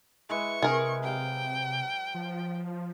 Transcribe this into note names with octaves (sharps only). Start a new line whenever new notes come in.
G#3 E4 B4 C#6
C3 G#4 A#4
F#3 F5 G5
F3